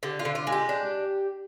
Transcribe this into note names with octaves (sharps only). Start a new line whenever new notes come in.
D3 G4
F4
D3
F4
G#3
G4
D4